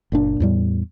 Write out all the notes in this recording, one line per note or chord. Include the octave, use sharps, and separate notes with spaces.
F#1 A#2 D4
E2 A2 G3